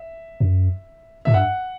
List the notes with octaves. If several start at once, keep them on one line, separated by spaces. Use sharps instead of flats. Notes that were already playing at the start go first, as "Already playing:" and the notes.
Already playing: E5
F#2
A2 E5
G2 F#5